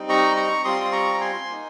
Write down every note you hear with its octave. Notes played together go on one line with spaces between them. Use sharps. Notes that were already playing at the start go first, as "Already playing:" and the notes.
Already playing: G3 C4 D#4
A#5 C#6
A#5 C#6
G3 C4 F4 C6 D#6
C6
A#5 C#6
A#5
G#5 C6
A#3 D#4